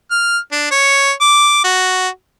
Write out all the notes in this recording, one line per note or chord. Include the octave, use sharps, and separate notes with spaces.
F6
D4
C#5
D6
F#4